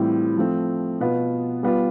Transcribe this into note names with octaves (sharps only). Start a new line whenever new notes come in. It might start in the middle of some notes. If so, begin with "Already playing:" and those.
Already playing: A2 E3 G3 C4 F4
F3 A3 C4
B2 B3 F4
G3 B3 F4